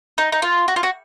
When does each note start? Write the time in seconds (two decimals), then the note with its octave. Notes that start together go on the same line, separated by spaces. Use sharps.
0.18 D#4
0.32 D#4
0.42 F4
0.68 F#4
0.76 F4
0.83 F#4